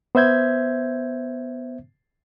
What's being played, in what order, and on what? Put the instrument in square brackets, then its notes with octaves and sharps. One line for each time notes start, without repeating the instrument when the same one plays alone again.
[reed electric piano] B3 C5 E5 G6 G#6